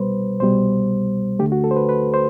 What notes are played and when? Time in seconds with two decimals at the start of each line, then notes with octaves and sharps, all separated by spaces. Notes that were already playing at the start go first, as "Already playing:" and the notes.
Already playing: C2 B2 G3 B4 C5
0.40 C2 B2 G3 C5
1.39 D2 D3 A3 G4
1.52 F#4
1.64 A4
1.71 C5
1.76 B4
1.89 B4
2.14 C5